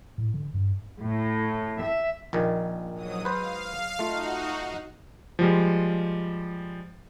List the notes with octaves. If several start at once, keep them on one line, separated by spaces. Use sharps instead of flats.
A2
D3
G2
A2
E5
A#1 A#2 D#3
G#2 F#3 D#6
B4 C5 F5
A3 D#4 F4 F#4
F3 G3 G#3